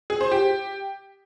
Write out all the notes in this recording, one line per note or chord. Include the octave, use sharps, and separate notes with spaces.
G#4
C5
G4